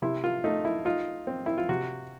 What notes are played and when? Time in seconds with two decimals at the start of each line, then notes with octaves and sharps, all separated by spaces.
0.02 C3 E4
0.24 F4
0.44 A3 D#4
0.65 E4
0.85 D#4 F4
1.27 C4
1.46 E4
1.58 F4
1.69 C3 F#4